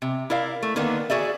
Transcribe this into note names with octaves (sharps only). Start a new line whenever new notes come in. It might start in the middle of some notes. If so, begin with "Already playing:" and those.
C3
E4 A#4 D5 F5
A3
D3 D#3 A#3 B3 D4
F#4 G#4 D5 E5